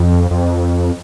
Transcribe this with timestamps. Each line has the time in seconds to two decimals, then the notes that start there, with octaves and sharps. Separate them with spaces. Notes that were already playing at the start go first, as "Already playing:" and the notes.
Already playing: F2
0.31 F2